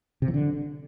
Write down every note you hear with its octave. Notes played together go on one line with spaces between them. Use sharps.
C3
F3
D3